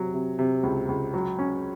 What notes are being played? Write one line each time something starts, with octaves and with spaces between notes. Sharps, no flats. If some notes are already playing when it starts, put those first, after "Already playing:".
Already playing: C3 F#3
C3
C3
C#2
C#2
F#3
C#4